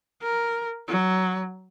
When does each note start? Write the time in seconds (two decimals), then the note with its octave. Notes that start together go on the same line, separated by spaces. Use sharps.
0.23 A#4
0.88 F#3